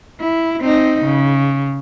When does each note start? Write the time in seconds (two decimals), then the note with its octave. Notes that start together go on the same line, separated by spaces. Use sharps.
0.21 E4
0.62 C4 D#4
1.05 C#3